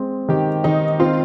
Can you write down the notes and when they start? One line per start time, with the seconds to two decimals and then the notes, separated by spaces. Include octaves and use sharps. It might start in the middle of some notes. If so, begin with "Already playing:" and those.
Already playing: G#3 C4
0.28 D#3 G4
0.64 D#3 D#4
1.00 C4 F4